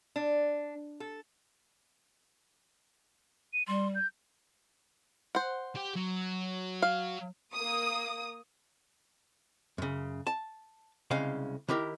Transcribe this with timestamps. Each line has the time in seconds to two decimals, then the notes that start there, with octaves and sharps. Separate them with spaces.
0.16 D4
1.00 A4
3.53 D#7
3.68 G3 C6
3.95 G6
5.35 C5 F#5
5.76 G4
5.96 F#3
6.82 F5
7.54 A#3 D#6
9.78 F#2 C#3
10.27 A5
11.11 C2 C#3 G#3 F5
11.68 D#3 E4 G4 A#4